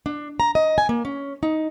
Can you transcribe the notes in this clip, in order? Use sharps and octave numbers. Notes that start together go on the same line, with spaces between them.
D4
A#5
D#5
G#5
A#3
C#4
D#4